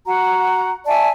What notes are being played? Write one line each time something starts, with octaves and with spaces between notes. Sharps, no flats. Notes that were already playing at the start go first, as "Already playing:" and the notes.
F#4 F#5 A#5
D5 E5 G#5 A5